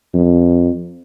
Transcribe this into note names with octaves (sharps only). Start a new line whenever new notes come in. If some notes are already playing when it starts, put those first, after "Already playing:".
F2